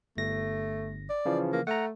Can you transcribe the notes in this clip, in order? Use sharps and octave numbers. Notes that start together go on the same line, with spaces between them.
G1 A3 A#6
D5
C#3 E3 F3
A#3
A3 F#5 A#5